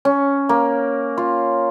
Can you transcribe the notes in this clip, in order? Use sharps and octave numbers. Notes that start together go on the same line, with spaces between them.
C#4
A#3
F4